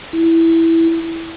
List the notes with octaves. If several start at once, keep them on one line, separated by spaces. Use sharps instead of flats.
E4